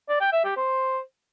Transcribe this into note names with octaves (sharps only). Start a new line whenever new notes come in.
D5
G5
E5
G4
C5